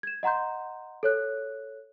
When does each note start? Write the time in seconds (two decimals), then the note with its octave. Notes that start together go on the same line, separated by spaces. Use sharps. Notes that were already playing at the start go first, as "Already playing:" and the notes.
0.03 G#6 E7
0.23 D#5 F#5 A#5 C6 G6
1.03 A4 C#5 F#6